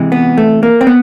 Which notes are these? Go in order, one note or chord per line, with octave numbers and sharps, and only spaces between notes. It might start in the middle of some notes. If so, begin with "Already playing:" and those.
Already playing: C3 E3 G#3
B3
A3
A#3
C4
B3